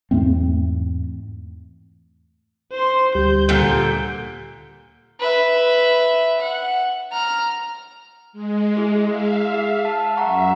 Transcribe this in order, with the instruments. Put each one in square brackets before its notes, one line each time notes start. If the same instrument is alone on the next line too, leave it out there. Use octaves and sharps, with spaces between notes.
[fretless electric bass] E2 G#2 A3 C4
[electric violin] C5 C6
[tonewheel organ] D2 G3 G4 [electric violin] G6
[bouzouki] A#2 D3
[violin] B4 E5
F#5
A#5 F6
[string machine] G#3
[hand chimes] E4 G#4
[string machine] E5 F5
[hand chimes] G#4
A5
[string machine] F#2 E5 [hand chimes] F#5 A#5 C#6